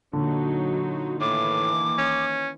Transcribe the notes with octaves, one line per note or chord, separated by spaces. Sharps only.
A#2 D3 F#3 D#4
A2 D#3 E3 A#3 D6
C#4